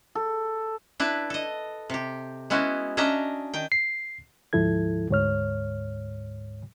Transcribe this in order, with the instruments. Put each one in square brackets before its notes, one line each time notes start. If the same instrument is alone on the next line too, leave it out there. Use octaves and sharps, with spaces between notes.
[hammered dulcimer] A4
[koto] D4 E4 B4
A4 D#5
C3 G4
G#3 B3 C#4 E4 F#4
C#4 D4 D#5 E5 A#5
D#3 G5
[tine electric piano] C7
[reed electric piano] D2 G#2 F3 E4 A4 G#6
D2 G#2 C#5 F6